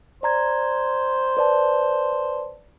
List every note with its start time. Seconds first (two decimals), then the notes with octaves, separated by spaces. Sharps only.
0.23 C5 D5 A#5 G#6
1.37 B4 D5 A5